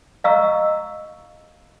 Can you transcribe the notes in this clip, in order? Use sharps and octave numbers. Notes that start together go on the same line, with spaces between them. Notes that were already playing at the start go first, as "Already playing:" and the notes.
D#5 F5 A#5 C#6 E6